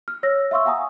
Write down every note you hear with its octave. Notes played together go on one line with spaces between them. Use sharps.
F6
C#5 E6 A#6
E5 F5 C6 C#6 E6
F5 F#5 G#5 A#5 D#6